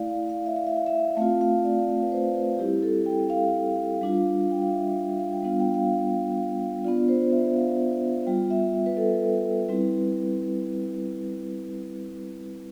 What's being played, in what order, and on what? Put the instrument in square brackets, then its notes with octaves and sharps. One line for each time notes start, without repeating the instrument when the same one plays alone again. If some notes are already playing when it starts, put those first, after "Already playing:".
Already playing: [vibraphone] A3 E4 D5 F5
F5
F5
E5
F5
E5
F5
E5
A3 C4 F4 F5
F5
D5
B4
C5
B4
G3 C4 E4 G4
A4
G5
F5
G3 D4 F4
G5
F5
E5
F5
G5
G3 B3 D4 F4 F5
G5
F5
B3 D4 F4 D5
C5
E5
F5
G3 B3 F4 G5
E5
E5
B4
A4
G3 C4 E4 B4